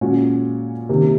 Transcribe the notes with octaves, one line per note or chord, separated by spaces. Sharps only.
A#2 G#3 C#4 F#4
C3 D#3 A#3